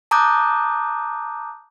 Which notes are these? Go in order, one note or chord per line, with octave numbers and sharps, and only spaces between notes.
A5 A#5 D6 D#6 F#6 G6